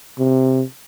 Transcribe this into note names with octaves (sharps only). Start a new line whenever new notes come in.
C3